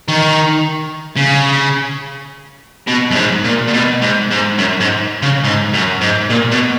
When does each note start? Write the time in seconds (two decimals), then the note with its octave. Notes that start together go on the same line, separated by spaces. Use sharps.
0.08 D#3
1.16 C#3
2.88 B2
3.11 F#2
3.15 G#2
3.44 A#2
3.68 A#2
3.73 B2
4.01 G#2
4.31 G#2
4.58 F#2
4.80 G#2
5.22 C#3
5.44 G#2
5.73 F#2
6.01 G#2
6.30 A#2
6.51 B2